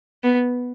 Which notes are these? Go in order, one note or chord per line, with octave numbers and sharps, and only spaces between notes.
B3